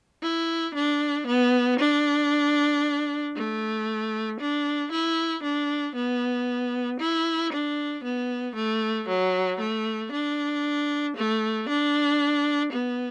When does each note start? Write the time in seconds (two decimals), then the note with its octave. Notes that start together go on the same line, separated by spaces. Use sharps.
0.22 E4
0.75 D4
1.27 B3
1.79 D4
3.36 A3
4.40 D4
4.92 E4
5.43 D4
5.95 B3
7.00 E4
7.53 D4
8.04 B3
8.56 A3
9.08 F#3
9.60 A3
10.12 D4
11.17 A3
11.69 D4
12.73 B3